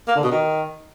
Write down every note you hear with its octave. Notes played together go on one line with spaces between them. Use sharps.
A#3
D3
B2
D#3